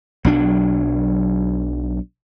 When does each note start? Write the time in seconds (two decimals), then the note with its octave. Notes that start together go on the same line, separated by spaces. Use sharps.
0.25 B1 F#3 D4